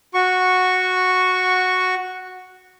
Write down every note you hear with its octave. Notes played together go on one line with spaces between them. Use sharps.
F#4 C#6